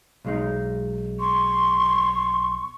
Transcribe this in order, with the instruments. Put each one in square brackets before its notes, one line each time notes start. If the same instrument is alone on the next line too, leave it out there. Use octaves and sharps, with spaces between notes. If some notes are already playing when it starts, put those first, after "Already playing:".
[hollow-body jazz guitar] B1 G#3 D#4
[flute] C6 [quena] C#6